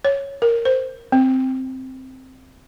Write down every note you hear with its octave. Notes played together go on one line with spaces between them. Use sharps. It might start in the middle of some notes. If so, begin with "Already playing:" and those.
C#5
A#4
C5
C4